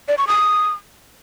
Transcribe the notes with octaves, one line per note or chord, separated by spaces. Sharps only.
D5
C#6
D#6